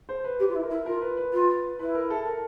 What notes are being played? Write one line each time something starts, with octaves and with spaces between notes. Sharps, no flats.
C5
B4
G4 B4
F4
E4
A#4
E4
F4 A#4
B4
B4
F4
E4 B4
A#4
A4
A#4